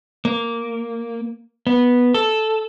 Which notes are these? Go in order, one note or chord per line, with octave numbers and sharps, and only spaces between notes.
A#3
B3
A4